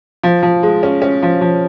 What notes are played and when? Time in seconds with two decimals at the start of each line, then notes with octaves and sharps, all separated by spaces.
0.23 F3
0.43 F3
0.63 G#3
0.83 C#4
1.02 C#4
1.23 F3
1.41 F3